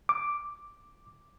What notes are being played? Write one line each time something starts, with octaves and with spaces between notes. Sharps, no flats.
D6